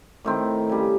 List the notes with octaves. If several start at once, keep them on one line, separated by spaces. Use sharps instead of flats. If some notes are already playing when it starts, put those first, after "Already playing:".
A2 D#3 C4
C#3 G3